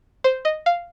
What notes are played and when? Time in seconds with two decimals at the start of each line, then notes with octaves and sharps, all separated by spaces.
0.24 C5
0.45 D#5
0.66 F5